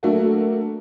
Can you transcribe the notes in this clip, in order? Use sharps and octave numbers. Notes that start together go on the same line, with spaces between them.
F#3 A3 A#3 D4 F#4 A4